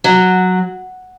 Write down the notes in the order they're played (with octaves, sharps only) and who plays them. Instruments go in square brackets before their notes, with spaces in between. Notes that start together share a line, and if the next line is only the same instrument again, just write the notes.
[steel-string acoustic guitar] F#3